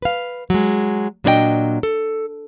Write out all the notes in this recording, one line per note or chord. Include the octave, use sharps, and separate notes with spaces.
B4 F5
F#3 G#3
A#2 F#3 D4 B4 D#5 G5
A4